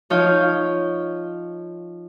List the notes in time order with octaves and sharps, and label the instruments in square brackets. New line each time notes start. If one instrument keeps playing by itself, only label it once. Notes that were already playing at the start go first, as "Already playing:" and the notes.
[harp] F3 D#4 C#5 F5 G6